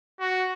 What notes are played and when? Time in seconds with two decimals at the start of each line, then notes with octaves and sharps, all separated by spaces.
0.20 F#4